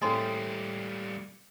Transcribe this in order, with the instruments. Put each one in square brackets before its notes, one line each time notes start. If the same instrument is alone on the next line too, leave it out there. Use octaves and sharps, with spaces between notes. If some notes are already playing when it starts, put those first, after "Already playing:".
[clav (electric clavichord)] A2 C4 G#4 [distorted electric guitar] G3 A#3 [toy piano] D#5 C6